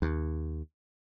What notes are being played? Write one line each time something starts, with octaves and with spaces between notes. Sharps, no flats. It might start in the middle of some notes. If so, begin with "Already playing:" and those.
D#2